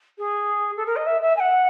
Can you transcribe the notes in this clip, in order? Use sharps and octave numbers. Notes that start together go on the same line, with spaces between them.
G#4
A4
A#4
D#5
E5
E5
G#5
F#5